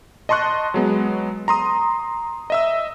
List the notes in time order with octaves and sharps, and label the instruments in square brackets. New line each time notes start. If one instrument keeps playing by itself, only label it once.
[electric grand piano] D#5 A5 C6 C#6 F#6
F#3 G#3 B3
A#5 C6 D#6
D#5 E5 E6